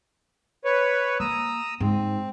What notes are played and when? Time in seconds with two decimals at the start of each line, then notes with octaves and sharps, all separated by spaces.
0.65 B4 C#5
1.20 A#3 A#5 D#6 E6
1.80 G#2 C4